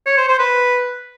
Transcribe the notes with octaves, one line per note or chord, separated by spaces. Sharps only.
C#5
C5
C5
B4